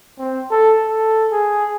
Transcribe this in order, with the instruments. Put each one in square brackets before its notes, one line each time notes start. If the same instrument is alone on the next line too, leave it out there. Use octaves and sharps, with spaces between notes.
[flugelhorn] C4
A4
A4
G#4